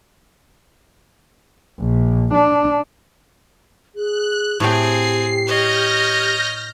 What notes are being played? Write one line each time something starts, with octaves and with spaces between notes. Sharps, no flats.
A#1
D4
G#4 F#6
A2 C4 G4 G#4 G5 C7
C#5 D#5 F6 G6 A#6